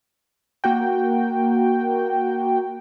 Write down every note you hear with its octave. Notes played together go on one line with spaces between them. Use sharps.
A#3 F#4 G5